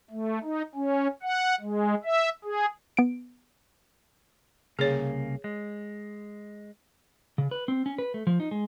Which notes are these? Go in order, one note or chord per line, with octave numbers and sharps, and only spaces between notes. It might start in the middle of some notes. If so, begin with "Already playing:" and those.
A3
D#4
C#4
F#5
G#3
E5
G#4
B3 D7
C2 C#3 A#3 G#4 C#5
G#3
C#3
B4
C4
C#4
B4
A3
F3
D#4
G#3